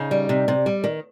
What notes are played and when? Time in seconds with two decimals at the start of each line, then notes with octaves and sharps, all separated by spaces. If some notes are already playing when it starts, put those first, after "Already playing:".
Already playing: C#3 D#4
0.11 G3
0.29 C3
0.48 C3
0.66 G3
0.84 D#3